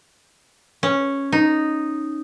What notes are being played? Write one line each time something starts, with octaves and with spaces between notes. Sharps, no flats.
C#4
D#4